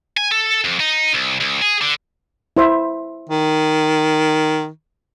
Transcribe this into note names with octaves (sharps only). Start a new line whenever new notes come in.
G#5
A4
F2
D#4
C2
C#2
G#4
D3
E4 C5 E5
D#3